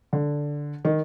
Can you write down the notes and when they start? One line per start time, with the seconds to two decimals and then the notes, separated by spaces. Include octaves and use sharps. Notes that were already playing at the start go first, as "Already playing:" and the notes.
0.13 D3
0.85 D#3